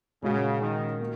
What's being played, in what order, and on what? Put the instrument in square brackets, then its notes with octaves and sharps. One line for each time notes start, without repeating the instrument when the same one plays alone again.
[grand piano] A#2 G#3 C#4 F#4 [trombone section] C#3
[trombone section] D#3
[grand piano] A#3